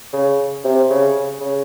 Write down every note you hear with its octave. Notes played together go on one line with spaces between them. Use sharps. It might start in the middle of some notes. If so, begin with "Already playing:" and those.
C#3
C3
C#3
C#3